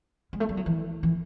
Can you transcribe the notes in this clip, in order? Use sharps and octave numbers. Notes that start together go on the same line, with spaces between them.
G#3
A3
G3
F#3
E3
E3